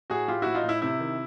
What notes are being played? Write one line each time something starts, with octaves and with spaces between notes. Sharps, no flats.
A2 F#4 G#4
A2 F4 G4
A2 E4 F#4
D#4 F4
A2
E4
C3 E4
D#3